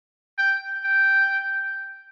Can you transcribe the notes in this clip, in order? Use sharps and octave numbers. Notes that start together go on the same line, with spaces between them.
G5
G5